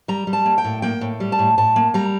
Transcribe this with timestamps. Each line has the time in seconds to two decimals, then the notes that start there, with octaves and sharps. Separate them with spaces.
0.08 G3 A#5
0.27 G3
0.33 A5
0.45 A#3
0.58 G5
0.64 A2
0.82 A#3 G5
1.01 A2
1.20 G3
1.32 A5
1.39 A2
1.58 A2 A5
1.76 A#3
1.94 G3 A#5